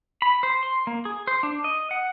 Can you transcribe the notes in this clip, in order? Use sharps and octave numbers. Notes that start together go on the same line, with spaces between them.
B5
C5
C6
A#3
G#4
C5
D4
D#5
F#5